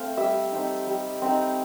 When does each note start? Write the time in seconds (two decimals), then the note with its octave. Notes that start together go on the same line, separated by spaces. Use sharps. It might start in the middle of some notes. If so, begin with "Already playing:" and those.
Already playing: A3 C4 F5
0.17 G3 E5
0.52 C4 D#4
0.87 G3
1.22 C4 D#4